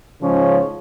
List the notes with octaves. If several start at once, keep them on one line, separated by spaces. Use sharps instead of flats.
G#2 C#3 F3 C#4